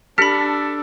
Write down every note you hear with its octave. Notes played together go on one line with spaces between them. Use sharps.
D4 G4 A4 B5 F6 B6